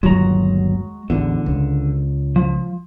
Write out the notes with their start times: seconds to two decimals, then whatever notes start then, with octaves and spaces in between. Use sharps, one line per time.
0.03 G1 D#2 F#3 G#3 F#4 A#5
1.10 A1 E2 D3
1.46 C#2
2.36 F3